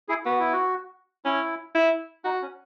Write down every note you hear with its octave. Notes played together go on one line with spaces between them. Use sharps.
E4 G#4
B3 F#4
E4
F#4
C#4 E4
E4
D#4 F#4
C#4